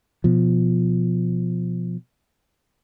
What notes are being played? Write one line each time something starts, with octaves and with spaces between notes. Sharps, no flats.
B2 F3